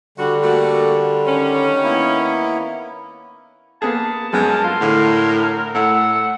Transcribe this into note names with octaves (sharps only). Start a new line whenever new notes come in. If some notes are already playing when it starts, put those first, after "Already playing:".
D3 G3 F#4
A3 A#3 F#4
D#3 C#4
A#3 B3 E4
A#3 B3 G#4 A5
F#2 G#3 B3 A#4
F4 C6
A2 D3
A2 A3 F#5 E6